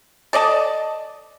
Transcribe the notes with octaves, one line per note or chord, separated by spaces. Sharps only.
A4 D5 D#5 A5